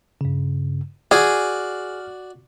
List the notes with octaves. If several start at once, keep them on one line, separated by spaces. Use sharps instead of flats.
G2 C#3
F#4 G#4 D5 F6